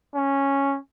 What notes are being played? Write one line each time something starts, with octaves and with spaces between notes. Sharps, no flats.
C#4